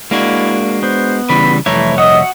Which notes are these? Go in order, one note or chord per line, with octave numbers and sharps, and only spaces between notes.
G#3 A#3 D4 E4 F#4
B3 C5
C#3 E3 G3 B5
C2 F2 E3 A3 E4 C#5 A#5
F#4 D#5 E5 F#5 D#6